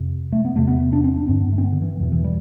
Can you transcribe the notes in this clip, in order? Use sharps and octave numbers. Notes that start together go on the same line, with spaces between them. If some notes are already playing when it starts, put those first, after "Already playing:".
Already playing: F2 C3
A3
B3
E2 C3 A3
B3
D4
C4
D4
G2 D3 C4
B3
A3
C4
B3
D3
E3
E2 B2 E3
E3
G3